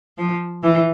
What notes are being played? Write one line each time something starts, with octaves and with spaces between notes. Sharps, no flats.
F3
E3